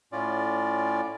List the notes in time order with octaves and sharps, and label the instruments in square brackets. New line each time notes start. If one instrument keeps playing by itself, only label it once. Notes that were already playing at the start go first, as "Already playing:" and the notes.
[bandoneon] A2 C#4 F4 D5